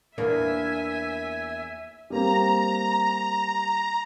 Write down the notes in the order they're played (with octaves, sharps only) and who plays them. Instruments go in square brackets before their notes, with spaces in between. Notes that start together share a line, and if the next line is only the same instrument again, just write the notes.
[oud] E2 A#3 D4 [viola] E5 G#5
[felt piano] G3 A#3 C4 [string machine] A#5